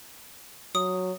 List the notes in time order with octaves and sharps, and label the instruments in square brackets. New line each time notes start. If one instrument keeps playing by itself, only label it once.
[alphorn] F#3 [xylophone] D#6